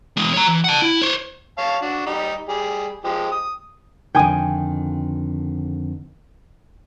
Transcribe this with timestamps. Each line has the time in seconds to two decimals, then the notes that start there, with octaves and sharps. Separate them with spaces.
0.17 E2 G#3
0.34 C#5 A#5
0.47 E3
0.64 F#5 A5
0.82 E4
1.01 C5 C#5
1.58 C#5 F5 A5
1.82 D4 F#4
2.06 G3 D#4
2.49 G3 G#4
3.04 F3 G#3 G4
3.32 D#6
4.15 F2 D3 D#3 G5 G#5 D#6